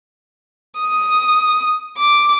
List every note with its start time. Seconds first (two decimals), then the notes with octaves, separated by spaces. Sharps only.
0.80 D#6
1.97 D6